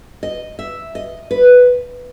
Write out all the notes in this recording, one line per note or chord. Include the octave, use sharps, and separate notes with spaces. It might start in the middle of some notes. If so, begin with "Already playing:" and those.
D#5
E5
D#5
B4